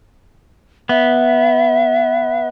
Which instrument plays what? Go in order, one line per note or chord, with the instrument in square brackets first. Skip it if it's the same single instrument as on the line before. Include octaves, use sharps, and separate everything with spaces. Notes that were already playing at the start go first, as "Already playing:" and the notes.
[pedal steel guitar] B3 [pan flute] E5